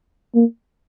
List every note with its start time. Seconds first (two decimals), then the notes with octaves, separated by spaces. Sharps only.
0.35 A#3